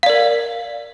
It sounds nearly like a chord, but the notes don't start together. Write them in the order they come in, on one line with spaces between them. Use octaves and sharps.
F5 D5 A#4